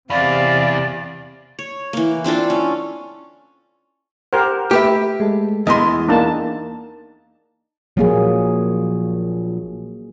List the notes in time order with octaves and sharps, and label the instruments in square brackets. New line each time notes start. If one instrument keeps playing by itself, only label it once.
[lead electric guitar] E2 [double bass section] C3 [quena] D5 [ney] F5
[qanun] C#5
E3 A#3
C4 D4 F4 A4
C#4
[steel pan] G4 A#4 C5 [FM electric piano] F#5
[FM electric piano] A3 [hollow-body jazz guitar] G4 B4 E5 [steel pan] G5
[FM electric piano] G#3 A3 A4
[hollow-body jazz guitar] E2 E3 C6 [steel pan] D#5
[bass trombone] A#3 [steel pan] D4 D#4 A5
[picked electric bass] A#2 F3 [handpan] F#3 A#3 G#4